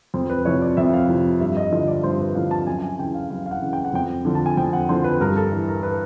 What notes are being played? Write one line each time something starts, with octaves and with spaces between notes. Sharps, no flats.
F2 C5
B4
C3 F3 C#5
D5
F2 E5
F5
C3 F3
G2 E5
D#5
D3 F3 D#5
D5
G2 C5
B4
D3 F3 F5
A5
F#2 G#5
G#5
C#3 E3 G5
F5
F#2 F5
F5
F#5
C#3 E3
G5
F#5
F2 G5
D3 F3
A5
G#5
F2 G5
F#5
D3 F3 C5
B4
G2 A#4
A4
E3
A#4
B4